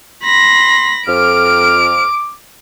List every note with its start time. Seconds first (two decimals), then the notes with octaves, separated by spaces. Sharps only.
0.23 B5 C6 A#6
1.07 F2 D6 F6 D7